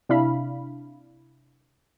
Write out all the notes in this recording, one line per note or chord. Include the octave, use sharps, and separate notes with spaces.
C3 D4 E4 F5 B5